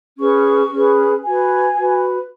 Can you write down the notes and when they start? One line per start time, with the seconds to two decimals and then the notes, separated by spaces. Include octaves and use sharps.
0.19 C#4 G#4 B4 C#6
0.71 C#4 G#4 B4
1.24 F#4 B4 G#5
1.76 F#4 B4